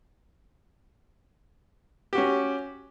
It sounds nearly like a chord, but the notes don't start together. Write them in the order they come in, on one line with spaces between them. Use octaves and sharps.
G4 F#4 C#4